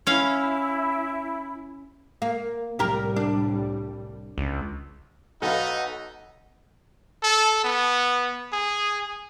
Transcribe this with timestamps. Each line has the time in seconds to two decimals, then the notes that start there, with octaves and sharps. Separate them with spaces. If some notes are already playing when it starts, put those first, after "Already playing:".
0.07 C#4 E4 F5
2.22 A#3
2.79 C2 A2 G3 G4 A#4
3.16 D4
4.38 C#2
5.42 B1 D#4 A4 B4 F5 F#5
7.23 A4
7.64 B3
8.52 G#4